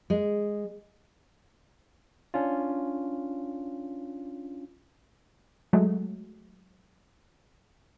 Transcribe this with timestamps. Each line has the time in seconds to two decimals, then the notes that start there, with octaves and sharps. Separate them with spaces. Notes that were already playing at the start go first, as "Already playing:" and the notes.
0.10 G#3
2.34 C#4 D4 F4
5.73 F#3 G#3 A3